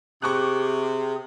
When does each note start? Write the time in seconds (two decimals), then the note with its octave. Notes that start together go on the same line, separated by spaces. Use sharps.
0.22 C3 G#4 C#6 D6 F#6